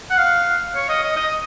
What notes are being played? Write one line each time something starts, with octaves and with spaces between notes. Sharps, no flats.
F#5
F5
C#5
D#5
D#5
D#5